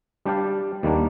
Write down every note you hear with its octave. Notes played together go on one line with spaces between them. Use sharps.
G3 D4 G4 D5 F5
D#2 D#3 G3 A#3 D4